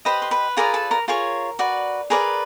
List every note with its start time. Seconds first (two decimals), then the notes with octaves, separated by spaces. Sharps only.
0.05 G4 B4 C5 D#5 B5
0.22 C6
0.31 B4 B5
0.57 F4 G#4 A#4 B4 D5 A#5
0.74 A4 A5
0.91 A#4 A#5
1.08 F4 G#4 A#4 C#5 A#5
1.59 F#4 B4 D5
2.10 G#4 A#4 B4 D5 A#5